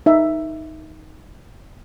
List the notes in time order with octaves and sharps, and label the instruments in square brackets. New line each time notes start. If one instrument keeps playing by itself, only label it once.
[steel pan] D#4 E5